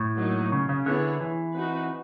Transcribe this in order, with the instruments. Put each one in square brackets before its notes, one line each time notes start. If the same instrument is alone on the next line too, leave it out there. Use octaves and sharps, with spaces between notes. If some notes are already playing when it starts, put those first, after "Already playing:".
Already playing: [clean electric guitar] A2
[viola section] F#3 A#3 D#4
[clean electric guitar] C#3
C#3
[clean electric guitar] D3 [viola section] B3 E4 G#4 C#5
[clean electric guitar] E3
[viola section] C4 D#4 F#4 B4